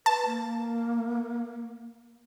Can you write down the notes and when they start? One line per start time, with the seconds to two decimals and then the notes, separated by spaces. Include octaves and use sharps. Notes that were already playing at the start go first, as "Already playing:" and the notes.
0.06 B4 A5
0.26 A#3